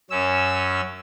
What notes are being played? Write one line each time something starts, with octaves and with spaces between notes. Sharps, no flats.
F#2 C#4 E6